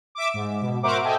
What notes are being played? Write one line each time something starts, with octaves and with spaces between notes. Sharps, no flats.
E5 D6
G#2
B2
F#4 A#4 C5 E5 F#5 D6
A4 D#5 E5 G5 G#5